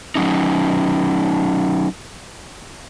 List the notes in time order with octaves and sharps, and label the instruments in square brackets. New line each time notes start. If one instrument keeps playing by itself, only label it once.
[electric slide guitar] F#3 C#4 D#4